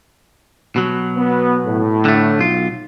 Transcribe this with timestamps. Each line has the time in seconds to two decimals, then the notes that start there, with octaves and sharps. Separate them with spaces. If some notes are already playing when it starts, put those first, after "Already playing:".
0.76 B2 F#3
1.17 B3
1.66 A2
2.05 D3 A3
2.39 B1 F4